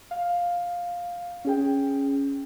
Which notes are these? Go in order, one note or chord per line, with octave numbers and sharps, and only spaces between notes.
F5
C#4 G#4 G5